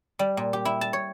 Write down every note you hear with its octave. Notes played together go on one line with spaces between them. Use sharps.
G3
A#2
G4
E4
A5
C#5